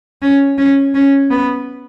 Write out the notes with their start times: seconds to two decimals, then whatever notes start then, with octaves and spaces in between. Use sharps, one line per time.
0.22 C#4
0.58 C#4
0.95 C#4
1.30 B3